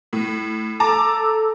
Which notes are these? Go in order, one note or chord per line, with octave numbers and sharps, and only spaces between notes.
A2
A4 A5 A#5 D6